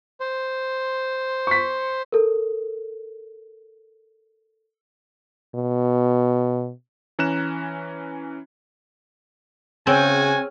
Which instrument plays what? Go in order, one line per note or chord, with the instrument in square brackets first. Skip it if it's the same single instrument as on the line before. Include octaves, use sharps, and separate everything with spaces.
[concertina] C5
[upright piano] C#6 B6
[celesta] A4 A#4
[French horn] B2
[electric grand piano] E3 C#4 A#5 F#6 E7
[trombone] C#3 [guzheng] C4 [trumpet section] F#4 G#5 [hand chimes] G#4 C#5 F6